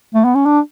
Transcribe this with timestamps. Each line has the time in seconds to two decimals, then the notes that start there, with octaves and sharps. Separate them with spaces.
0.14 A3
0.24 B3
0.35 C#4
0.45 D4